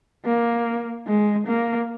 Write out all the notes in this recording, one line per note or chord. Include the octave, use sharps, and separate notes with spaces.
A#3
G#3
A#3